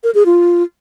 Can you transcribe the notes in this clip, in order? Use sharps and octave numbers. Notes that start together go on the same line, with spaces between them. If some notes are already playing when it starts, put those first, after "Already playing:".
A#4
G#4
F4